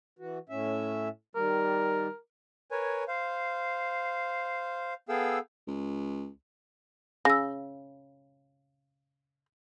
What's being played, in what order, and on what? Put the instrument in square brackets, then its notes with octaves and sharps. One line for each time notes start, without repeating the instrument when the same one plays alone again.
[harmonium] E3 F#4
A2 C#4 E5
[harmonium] D#3 G3 [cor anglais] A#4
[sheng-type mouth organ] A#4 B4 C#5 G#5
C5 F5
B3 G#4 A4 F5 G5 E6
[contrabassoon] C#2
[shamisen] C#3 [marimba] E6 A#6